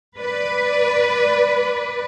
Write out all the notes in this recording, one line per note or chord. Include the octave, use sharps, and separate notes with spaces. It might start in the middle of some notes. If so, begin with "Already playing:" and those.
B4 D5